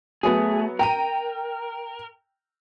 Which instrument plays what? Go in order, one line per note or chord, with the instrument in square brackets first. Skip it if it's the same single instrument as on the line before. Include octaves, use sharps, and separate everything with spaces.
[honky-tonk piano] F#3 B3 [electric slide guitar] A3 G#4
[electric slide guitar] A#4 [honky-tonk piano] G5 A#5 D#7